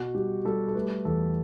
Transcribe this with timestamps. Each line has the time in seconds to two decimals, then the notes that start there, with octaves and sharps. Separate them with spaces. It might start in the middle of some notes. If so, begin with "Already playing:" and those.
Already playing: B2 F#4
0.14 G3 G4
0.45 G3 A4
0.68 A4
0.75 A3 B4
1.05 E2 A4